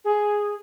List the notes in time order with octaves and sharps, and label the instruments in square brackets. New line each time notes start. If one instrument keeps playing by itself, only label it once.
[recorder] G#4